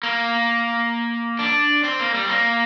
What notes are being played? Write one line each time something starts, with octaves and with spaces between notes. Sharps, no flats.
A#3
D4
C4
A#3
G3
C4
A#3